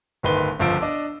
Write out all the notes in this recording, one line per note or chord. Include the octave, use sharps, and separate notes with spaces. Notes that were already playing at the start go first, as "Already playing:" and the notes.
D1 G1 D#3 B4 C6 G7
G1 C#2 F3 E6 D7
D4 D#5